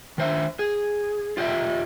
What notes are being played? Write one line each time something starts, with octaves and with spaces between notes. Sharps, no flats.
D#3 C5 E5
G#4
F4 G4 C#5 D#5 E5